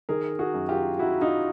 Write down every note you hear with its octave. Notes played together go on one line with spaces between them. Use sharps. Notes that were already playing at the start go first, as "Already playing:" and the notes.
D#3 G#4 A#4
F#4 G#4
F#2
F4 G4
F#3 E4 F#4
D#4 F4